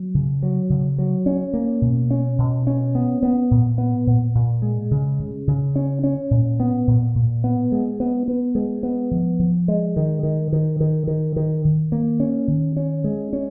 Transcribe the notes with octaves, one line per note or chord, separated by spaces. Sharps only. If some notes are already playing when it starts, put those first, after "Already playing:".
Already playing: F#3
C#3
F#3
C#3
F#3
C#4
A#3
B2
C#4
B2
C#4
B3
B3
A#2
B3
A#2
A#2
G#3
C#3
C#3
C#3
C#4
C#4
A#2
B3
A#2
A#2
B3
G#3
B3
B3
G#3
B3
F3
F3
G#3
D#3
D#3
D#3
D#3
D#3
D#3
D#3
A#3
C#4
D#3
C#4
G#3
C#4